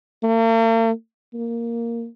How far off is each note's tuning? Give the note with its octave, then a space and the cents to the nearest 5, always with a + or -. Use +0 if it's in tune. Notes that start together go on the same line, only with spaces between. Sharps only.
A#3 -45
A#3 +0